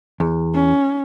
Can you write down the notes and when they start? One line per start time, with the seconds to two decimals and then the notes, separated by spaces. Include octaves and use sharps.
0.20 E2
0.55 C#4